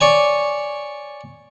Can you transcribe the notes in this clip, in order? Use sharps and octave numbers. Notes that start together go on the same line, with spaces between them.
C#5 D5 G#5